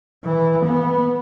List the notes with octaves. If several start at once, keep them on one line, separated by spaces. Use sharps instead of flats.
E3
B3